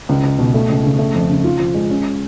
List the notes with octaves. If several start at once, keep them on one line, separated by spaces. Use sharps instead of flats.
C#2
C#2
B2
A3
C#2
C#3
A3
F2
C#3
F4
F3
G#3
C#4